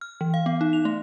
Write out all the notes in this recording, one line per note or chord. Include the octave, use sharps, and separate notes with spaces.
F6
E3
F5
B3
D#4
F7
A3